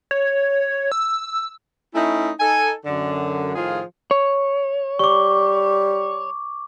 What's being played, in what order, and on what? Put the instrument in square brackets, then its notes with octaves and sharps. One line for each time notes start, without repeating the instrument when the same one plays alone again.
[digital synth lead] C#5
E6
[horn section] A3 C#4 D#4 E4
D#4 A4 G#5
F#2 D3
A2 D#3 F3 F4 G#4
[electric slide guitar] C#5
[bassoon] G3 [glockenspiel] C#6 D6